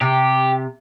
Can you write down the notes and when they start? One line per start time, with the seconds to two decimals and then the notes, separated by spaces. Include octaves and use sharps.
0.01 C3 G4